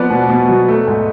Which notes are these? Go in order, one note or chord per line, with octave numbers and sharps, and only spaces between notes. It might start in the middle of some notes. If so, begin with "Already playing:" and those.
Already playing: F3 B3 B4 D5
B2
B2
F#3
A3
G#2